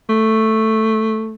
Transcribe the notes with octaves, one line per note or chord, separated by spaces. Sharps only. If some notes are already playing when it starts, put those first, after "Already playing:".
A3